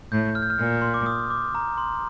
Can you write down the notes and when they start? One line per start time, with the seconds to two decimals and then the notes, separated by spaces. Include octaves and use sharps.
0.12 A2 G6
0.35 F6
0.42 G6
0.50 F6
0.59 A#2
0.82 C6
0.94 D6
1.06 D#6
1.30 D6
1.55 A#5
1.78 C6